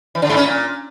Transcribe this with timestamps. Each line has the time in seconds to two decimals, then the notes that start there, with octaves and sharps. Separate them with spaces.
0.15 E3
0.22 D3
0.29 G#2
0.37 C#4
0.44 A#2